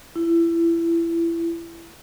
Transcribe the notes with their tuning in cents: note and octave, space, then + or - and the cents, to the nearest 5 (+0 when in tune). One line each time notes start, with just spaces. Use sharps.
E4 +25